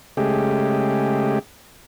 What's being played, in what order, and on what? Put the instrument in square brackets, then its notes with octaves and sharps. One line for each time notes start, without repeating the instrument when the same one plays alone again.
[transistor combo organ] C#3 G#3 A3 G4